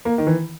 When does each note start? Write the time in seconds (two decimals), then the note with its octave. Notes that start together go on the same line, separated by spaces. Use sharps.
0.05 A#3
0.18 D#3
0.27 E3